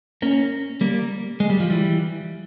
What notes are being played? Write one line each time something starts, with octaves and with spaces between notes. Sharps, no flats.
A#3 C#4
G3 A#3
G#3
G3
F3
E3 G3